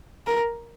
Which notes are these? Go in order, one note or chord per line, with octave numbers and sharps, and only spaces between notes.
A#4